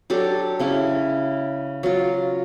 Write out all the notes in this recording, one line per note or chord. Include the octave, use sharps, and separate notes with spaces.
F#3 D4 G4 A4
C#3 C#4 E4
F#3 F4